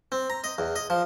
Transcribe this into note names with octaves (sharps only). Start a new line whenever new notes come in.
C4
A#5
D#5
E2
D#5
F3